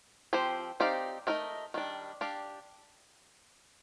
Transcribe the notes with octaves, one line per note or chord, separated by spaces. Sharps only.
F3 C4 G4 C5
C4 D#4 G4 D5 F5
A3 D#4 A#4 D#5
D#3 G3 D4
D4 G4 D5 F5